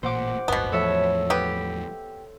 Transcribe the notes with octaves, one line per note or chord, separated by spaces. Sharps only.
A1 A#2 C5 F#5 D6
D1 G1 B2 B3
E2 A2 F3 A4 C#5 E5
B3 G4